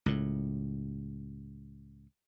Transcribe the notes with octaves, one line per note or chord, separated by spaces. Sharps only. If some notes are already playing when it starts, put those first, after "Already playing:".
C#2 A2